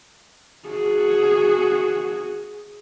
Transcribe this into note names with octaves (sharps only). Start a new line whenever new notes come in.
F#4 G#4